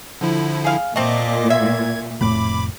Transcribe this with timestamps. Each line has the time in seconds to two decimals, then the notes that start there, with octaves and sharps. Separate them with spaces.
0.21 D3 F3 E4
0.64 G#4 F5
0.96 A#2 A3 C4 D#5 D6
1.50 E5 G#6
2.21 F1 A2 B5 D6